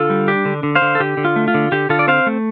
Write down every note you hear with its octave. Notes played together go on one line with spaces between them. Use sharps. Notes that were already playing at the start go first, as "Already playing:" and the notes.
Already playing: D3 F4 A4
G3
D4 G4
D3
D3
C5 F5
D3
A4
D3 G4
D3
F4
A3
F4
D3
D3 G4
D3 F4 A4
D5
C4 C5 F5
A3